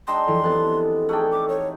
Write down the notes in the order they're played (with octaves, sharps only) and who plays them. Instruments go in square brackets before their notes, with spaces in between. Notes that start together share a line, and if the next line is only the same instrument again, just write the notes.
[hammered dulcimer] G#3 D4 D#5 [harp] G5 A#5 E6 [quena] C6
[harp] F2 E3 [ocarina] A4
[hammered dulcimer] C3 B3 [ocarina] A4 [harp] A5 F#6
[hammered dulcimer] A3 D#4 D5 [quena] G#4 [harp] G5 F#6
[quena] D6
C#5